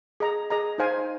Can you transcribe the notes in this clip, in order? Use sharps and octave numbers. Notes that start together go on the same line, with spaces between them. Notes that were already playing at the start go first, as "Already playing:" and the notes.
G#4 D#5 A#5
G#4 D#5 A#5
D#4 C5 F5 G#5